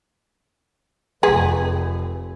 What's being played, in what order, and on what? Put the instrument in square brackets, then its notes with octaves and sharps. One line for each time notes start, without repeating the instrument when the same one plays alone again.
[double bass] F1 [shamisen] G#4 B4